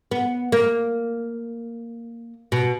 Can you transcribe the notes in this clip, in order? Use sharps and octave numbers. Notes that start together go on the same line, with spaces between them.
B3
A#3
B2